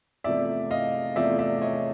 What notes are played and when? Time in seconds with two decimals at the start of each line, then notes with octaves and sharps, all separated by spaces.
0.24 E2 C3 F3 A3 D5 E5
0.71 D#5 F5
1.16 E2 C3 F3 A3 D5 E5
1.39 D5 E5
1.61 C#5 D#5